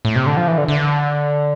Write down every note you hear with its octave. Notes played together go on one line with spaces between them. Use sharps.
A2
C3
D3
F3
E3
D3
D3